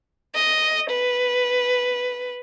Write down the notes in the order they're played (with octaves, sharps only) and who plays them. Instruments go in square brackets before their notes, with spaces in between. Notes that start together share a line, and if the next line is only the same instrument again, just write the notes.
[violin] D#5
B4